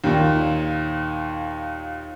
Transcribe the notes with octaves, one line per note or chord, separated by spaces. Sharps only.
D#2 A#2